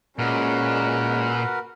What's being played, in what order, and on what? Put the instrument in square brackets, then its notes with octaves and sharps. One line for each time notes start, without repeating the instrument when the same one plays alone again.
[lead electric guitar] A#2 [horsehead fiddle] G#3 C#4 [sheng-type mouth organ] F#4 A#4 B4